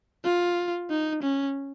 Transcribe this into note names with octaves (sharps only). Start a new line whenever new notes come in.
F4
D#4
C#4